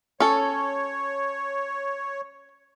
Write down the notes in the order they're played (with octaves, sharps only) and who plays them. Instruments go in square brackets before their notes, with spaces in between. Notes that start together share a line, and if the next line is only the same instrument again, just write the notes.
[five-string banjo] C#4 A4 [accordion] C#5